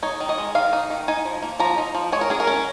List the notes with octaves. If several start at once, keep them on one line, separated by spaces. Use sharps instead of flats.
D#4 C#5
D#3
D#5
G#3
D#3 F5
D#4
D#3
D#4 G#5
F3
A#3
F3 A#5
D#4
F3
G#3 C#5
A#4
C#4 G#4
A#4
C#4